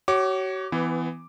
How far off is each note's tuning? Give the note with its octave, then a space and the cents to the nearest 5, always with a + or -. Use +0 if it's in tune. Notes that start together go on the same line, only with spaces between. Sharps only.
F#4 +40 C#5 +0 D6 +0
E3 +0 B3 +25